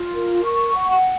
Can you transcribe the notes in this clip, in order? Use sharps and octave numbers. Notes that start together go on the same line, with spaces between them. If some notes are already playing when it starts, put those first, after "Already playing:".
Already playing: F4
A#4
C#6
F#5